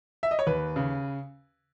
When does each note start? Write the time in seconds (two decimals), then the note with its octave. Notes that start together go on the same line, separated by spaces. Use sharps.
0.23 E5
0.31 D#5
0.39 C#5
0.47 D#2 B4
0.76 C#3